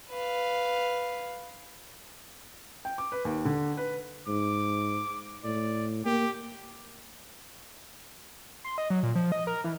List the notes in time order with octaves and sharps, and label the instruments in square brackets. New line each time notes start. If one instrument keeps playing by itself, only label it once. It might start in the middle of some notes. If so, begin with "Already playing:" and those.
[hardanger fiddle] B4 F5
[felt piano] G5
D6
B4
D#2
D3
B4
[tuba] G#2 [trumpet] D6
[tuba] A2 [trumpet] D5
[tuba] A#3 [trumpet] G4
[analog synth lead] C6
D#5
F#3
A#2
F3
D#5
A#4
E3